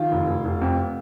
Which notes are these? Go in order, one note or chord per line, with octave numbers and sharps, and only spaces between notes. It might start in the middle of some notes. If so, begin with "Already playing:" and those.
Already playing: D#3 F4
F1
F1
F1
F2